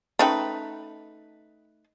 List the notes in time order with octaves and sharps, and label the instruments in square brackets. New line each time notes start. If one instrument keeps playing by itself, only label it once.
[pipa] A3 D#4 B4 [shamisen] C#4 G5